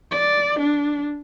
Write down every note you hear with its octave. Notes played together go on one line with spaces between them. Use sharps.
D5
D4